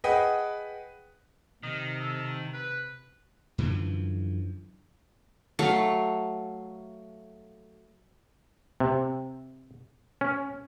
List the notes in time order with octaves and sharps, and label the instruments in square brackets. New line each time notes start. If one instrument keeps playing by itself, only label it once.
[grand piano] G#4 B4 D#5 F#5 G5
[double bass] C3 [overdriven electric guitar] D#3 [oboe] D#5
[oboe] A4
B4
[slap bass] F#2 D3 E3 F3
[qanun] F#3 A3 F5
[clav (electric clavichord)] C3
C#4